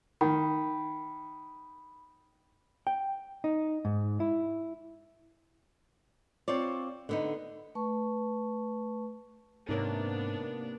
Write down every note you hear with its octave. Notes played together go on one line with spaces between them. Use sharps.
D#3 B5
G5
D#4
G#2
E4
C4 F4 C#5 D5
D3 B3 D#4
A3 B4 A5 C#6
G#2 C3 A#3 B3 D4 D#4 A#4 C#5